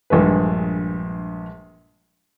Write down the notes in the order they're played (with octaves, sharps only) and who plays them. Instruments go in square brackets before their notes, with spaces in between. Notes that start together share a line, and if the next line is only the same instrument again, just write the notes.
[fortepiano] A#1 G2 G#3 B4